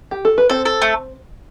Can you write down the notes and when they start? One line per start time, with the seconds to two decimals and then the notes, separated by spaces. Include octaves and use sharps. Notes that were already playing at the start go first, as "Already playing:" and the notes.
0.11 G4
0.25 A4
0.38 B4
0.49 C4 A4 C5
0.65 A4
0.82 A3